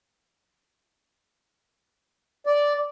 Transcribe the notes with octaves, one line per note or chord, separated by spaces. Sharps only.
D5